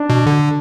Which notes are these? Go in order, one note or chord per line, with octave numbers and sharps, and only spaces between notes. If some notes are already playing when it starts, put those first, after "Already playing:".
Already playing: D4
B2
D3